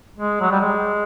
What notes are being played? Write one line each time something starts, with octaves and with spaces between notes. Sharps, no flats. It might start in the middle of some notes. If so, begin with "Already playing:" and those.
G#3
F#3
G3
G#3